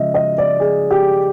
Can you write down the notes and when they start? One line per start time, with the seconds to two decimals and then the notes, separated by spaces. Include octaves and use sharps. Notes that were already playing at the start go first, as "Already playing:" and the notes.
Already playing: C#3 F3 G#3 D#5 E5
0.14 D#5
0.38 D5
0.60 G#4
0.91 G4